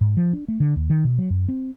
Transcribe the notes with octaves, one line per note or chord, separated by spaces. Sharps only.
G#2
F3
D4
A3
D3
D#2
D#3
B2
F#3
F#2
C4